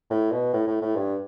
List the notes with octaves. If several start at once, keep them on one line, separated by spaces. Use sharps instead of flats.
A2
B2
A2
A2
A2
G2